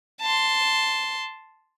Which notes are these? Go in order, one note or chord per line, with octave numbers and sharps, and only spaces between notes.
A5 C6